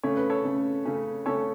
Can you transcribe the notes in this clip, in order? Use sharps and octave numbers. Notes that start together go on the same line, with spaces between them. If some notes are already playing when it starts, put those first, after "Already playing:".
C#3 A3 C#4 C#5
B4
A4 C#5
C#3 A3 C#4
C#3 A3 C#4
C#3 A3 C#4 A4 C#5